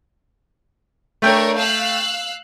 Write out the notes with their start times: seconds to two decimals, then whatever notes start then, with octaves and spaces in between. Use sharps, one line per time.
1.22 A3 D4 A#4 C#5 G5
1.57 F5 E6 F#6